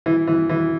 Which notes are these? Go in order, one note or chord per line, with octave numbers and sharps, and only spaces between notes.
E3
E3
E3